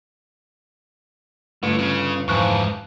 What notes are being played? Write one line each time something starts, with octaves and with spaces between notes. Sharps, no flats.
G1 A2
C#3
F2 G#2 E3 F3 C#6 F#6